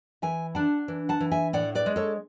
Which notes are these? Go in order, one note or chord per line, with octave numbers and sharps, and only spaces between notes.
E3 E5 G#5
D4 F#5 A5
E3
F#5 A5
E3
E5 G#5
A2 D5 F#5
B4 D5
G#3
A4 C#5